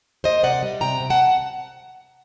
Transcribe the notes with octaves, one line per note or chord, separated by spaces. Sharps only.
A#3 C5 D#5
C3 D5 F#5
G3
C3 G5 A#5
C3
F#5 A5